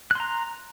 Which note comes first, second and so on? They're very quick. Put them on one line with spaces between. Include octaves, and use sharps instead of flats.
F#6 C6 A#5